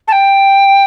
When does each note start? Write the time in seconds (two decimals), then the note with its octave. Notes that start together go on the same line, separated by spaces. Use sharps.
0.07 A5
0.12 G5